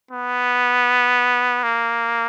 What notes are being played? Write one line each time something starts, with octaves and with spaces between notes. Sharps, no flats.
B3
A#3